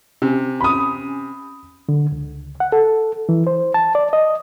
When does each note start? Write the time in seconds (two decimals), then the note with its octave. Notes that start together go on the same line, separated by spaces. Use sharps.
0.22 C3 C#4
0.61 B5 D#6
1.89 D3
2.12 C#2
2.60 F#5
2.72 A4
3.29 E3
3.47 C5
3.74 A5
3.95 D5
4.13 D#5